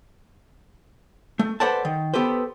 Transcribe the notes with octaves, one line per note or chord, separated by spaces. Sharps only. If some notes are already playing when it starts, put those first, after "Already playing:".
A3
A4 B4 C5 D5 F#5 A5
D#3
B3 G4 A4 B4 C5